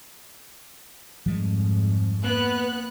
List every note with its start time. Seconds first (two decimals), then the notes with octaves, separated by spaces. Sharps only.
1.26 F2 G#2 F3 G3 G#3
2.24 A#3 B3 F#6